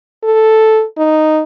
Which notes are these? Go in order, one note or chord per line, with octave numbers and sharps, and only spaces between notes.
A4
D#4